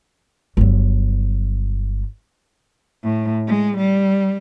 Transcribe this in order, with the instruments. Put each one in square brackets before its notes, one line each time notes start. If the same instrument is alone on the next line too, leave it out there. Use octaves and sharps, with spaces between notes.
[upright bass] G1 F#3
[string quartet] A2
G#3
G3